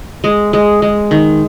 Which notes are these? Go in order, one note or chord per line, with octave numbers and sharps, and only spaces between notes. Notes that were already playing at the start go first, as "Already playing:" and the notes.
G#3
G#3
G#3
D#3